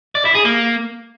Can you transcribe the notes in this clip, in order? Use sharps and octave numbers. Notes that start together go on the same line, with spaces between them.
D5
E4
G#4
A#3